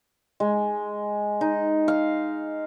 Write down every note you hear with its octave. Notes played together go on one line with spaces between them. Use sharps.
G#3
D#4
F5